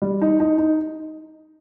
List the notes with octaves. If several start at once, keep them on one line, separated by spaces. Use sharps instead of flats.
G3
D#4
D#4
D#4